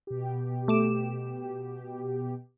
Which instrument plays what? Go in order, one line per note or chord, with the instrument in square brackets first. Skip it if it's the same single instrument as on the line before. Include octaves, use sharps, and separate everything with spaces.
[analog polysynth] B2 G4
[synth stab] A3 D6 E7